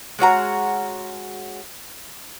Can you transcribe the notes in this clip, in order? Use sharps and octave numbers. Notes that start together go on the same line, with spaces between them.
G#3 C#4 F#4 A#5